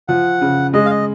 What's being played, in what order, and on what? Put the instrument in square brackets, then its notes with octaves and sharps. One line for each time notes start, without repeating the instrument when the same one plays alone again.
[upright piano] F3 [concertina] F#5
[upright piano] C#3
[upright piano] G#3 [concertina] D#5
[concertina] F5
D#5